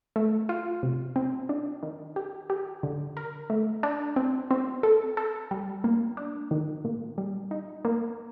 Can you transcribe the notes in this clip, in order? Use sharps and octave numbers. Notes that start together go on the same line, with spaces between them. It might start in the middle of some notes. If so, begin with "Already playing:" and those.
A3
F4
C3
C4
D4
D#3
G4
G4
D3
A#4
A3
D4
C4
C4
A4
A4
G3
A#3
D4
D#3
A#2
G3
D#4
A#3